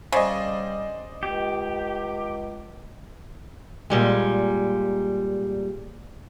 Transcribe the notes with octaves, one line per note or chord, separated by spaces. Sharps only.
C#3 G3 C5 D5 D#5
C#2 G4
A#2 G3 G#3